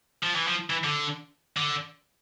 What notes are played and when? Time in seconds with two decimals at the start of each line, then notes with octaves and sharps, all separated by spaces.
0.23 F3
0.35 E3
0.47 F3
0.70 E3
0.84 D3
1.57 D3